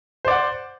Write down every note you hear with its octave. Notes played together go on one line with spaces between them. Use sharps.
C5 D5 F#5